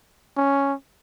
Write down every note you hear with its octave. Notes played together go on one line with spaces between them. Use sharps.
C#4